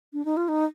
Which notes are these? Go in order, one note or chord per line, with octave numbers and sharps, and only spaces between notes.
D4
D#4
F4
D#4